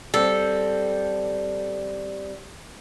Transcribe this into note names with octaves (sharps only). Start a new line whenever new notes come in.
G3 C4 A4